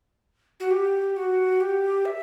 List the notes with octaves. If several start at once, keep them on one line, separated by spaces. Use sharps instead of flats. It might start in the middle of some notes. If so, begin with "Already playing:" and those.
F#4
G4
F#4
G4
E5